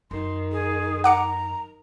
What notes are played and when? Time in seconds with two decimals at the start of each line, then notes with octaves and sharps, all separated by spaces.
0.11 F#2 D#3 C6
0.52 G#4
1.04 F#5 A#5 D6 C#7